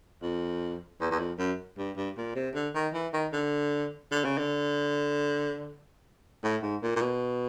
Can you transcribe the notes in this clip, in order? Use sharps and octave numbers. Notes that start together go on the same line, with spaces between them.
F2
E2
E2
F2
F#2
G2
G2
A#2
C3
D3
D#3
E3
D#3
D3
D3
C#3
D3
A2
G#2
A#2
A#2
B2